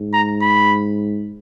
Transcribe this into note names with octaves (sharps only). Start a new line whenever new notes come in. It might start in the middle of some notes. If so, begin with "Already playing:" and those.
Already playing: G#2
A#5
B5